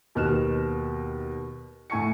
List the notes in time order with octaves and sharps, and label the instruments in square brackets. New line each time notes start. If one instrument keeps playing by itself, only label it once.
[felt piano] D#2 B2 F6 F#6 E7
A2 G#5 C#6 C#7